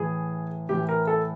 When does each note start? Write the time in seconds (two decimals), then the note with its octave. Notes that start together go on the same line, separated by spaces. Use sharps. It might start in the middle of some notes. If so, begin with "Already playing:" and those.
Already playing: A2 E3 G#4
0.69 A2 E3 G4
0.89 A#4
1.07 A4